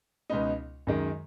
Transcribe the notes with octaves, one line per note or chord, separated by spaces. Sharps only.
C#2 B2 B3 D#4
F#2 D#3 G#3